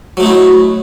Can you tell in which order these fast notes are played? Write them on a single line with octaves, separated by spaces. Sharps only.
F#3 A3 D#4 E4